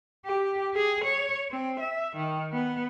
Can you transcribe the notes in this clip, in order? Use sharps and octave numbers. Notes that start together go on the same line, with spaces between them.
G4
G#4
C#5
C4
E5
D#3
B3